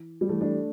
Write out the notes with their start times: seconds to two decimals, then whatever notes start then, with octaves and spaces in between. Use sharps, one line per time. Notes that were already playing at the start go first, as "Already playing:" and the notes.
Already playing: E3
0.21 G3
0.29 E3 A3
0.41 A3 D4